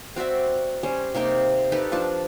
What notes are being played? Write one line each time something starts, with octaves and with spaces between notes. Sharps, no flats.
C4 F#4 D5 E5
G3 C#4 C5
C3 A#3 D#4 G5
D#4 G4 A4 B4
F3 D4 A5